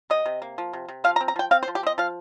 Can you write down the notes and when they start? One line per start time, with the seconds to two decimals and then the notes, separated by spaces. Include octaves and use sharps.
0.10 C3 D#5
0.26 C3
0.42 A#3
0.58 F3
0.73 C3
0.88 C3
1.04 F3 F5
1.16 A#5
1.21 C4
1.28 A#5
1.36 F3 G5
1.51 C4 F5
1.63 C5
1.68 F3
1.75 G4
1.83 C4 D#5
1.98 F3 F5